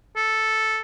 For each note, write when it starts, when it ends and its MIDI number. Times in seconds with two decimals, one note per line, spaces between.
0.16 0.81 69